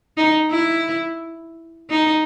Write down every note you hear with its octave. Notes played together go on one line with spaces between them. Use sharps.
D#4
E4
D#4